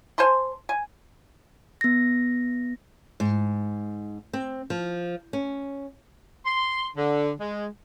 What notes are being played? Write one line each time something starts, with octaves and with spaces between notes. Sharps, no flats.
C5 G#5 A5 C6
G#5
B3 A#6
G#2
C4
F3
C#4
C6
D3
G#3